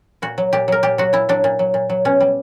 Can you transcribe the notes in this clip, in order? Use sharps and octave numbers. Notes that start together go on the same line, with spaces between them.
A#2 F#4
F#3
A#2 G4
F#3 A#4
A#2 G4
F#3 F#4
A#2 E4
F#3 D4
A#2
F#3
A#2
F#3
B2 C#4
G3